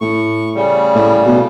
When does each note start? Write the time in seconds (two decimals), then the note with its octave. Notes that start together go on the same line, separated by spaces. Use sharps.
0.01 A2 C#6
0.55 C#3 G3
0.95 A2
1.26 B2